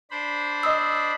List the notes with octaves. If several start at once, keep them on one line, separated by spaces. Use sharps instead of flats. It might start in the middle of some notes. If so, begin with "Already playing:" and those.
D4 C5 B5
D#5 D#6 E6